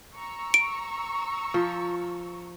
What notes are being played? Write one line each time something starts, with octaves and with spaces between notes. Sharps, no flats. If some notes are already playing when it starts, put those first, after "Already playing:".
A#5 C#6 E6
D7
F3